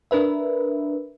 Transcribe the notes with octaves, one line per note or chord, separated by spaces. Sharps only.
D4 A#4 B4 E5